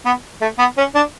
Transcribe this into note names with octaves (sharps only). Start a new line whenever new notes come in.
B3
A3
B3
C#4
D4